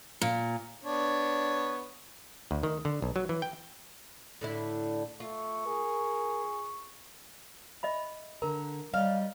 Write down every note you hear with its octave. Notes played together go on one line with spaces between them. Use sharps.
A#2
B3 D4 C#5
D2
D#3
D3
B1
F#3
E3
G5
A2 D3 E4
A3 F4 C#6
G#4 A#4
D#5 E5 B5
D3 A#4 A#5
F#3 G3 D5 D#5 F5